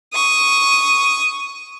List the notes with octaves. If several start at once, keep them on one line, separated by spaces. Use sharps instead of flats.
C#6 D#6